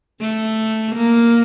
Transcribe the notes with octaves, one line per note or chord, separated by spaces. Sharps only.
A3
A#3